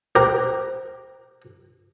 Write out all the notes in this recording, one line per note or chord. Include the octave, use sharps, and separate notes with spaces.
G4 A#4 C5